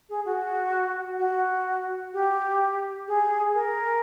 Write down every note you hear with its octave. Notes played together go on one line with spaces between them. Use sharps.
G#4
F#4
F#4
G4
G#4
A#4